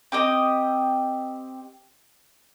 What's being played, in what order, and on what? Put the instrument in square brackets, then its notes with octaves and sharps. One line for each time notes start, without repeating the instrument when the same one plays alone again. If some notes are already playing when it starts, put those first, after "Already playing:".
[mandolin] C4 G4 D#5